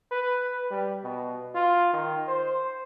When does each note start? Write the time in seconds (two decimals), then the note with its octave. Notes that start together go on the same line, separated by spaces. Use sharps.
0.11 B4
0.71 G3
1.03 B2
1.55 F4
1.93 D#3
2.28 C5